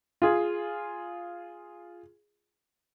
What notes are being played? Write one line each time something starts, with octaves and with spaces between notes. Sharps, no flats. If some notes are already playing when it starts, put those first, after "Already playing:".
F4 G#4